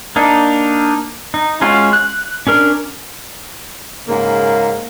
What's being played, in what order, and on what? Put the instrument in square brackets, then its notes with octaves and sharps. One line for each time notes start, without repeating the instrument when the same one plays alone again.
[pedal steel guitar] A#3 D4 D#4
D#4
G#3 C#4 F4 F#4
F#6
C#4 D4 A#4
[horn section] G#2 C#3 A#3